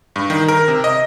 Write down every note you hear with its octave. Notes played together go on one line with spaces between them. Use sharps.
G2
D#3
A#4
C3
D#5